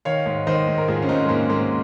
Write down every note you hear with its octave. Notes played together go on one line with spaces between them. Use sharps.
D#3 C#5 F5
G#2
D#3 C5 D#5
G#2
A#4
G#2 F4 G#4
C#4
G#2 C4 D#4
G#3
G#2 A#3
G#2 A#3